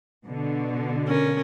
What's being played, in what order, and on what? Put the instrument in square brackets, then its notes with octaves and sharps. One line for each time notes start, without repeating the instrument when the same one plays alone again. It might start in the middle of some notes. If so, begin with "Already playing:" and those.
[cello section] B2 D3
[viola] C#4 A#4